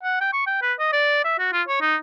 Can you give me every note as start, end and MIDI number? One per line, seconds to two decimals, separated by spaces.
0.04 0.19 78
0.21 0.32 79
0.33 0.47 85
0.47 0.59 79
0.62 0.74 71
0.80 0.92 75
0.93 1.24 74
1.25 1.36 76
1.39 1.48 66
1.53 1.62 65
1.68 1.79 73
1.81 1.96 63